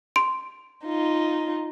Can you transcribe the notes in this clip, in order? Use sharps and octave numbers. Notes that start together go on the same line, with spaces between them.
C6 D7
D#4 F4